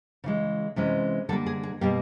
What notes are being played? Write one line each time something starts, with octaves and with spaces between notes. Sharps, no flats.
C#3 E3 G#3
C3 E3 G#3 C#4
D3 G3 A#3 A4
G#4
G#4
B2 G3 A#3 G4